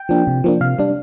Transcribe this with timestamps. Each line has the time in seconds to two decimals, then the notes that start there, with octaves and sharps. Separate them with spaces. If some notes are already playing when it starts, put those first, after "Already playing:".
Already playing: G5
0.09 F3 A#3 D4
0.27 C3
0.44 F3 A#3 D4
0.61 C3 F5
0.79 G3 D4